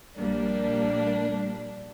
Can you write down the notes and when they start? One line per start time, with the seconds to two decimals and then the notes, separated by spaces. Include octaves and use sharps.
0.17 A#1 G3 A#3 D4